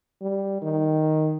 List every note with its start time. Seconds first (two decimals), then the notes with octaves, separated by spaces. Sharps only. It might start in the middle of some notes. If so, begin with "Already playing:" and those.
0.22 G3
0.62 D#3